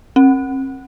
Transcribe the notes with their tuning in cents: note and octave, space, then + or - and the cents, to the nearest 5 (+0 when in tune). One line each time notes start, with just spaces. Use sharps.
C4 +45